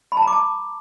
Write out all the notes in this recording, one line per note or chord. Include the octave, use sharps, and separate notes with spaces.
B5
A5
A#5
D6
A5